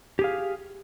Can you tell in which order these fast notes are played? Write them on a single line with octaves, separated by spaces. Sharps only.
G4 G#4 F5